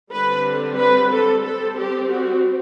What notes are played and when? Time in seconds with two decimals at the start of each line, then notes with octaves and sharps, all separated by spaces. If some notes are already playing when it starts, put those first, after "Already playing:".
0.13 D3 G3 C4 B4
0.79 B4
1.11 A4
1.44 G3 C4 A4
1.78 G4
2.11 F#4